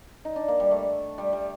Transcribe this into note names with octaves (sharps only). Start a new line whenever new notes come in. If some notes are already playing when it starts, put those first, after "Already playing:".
D#4
D4
A#3
G3
A3
G3
G3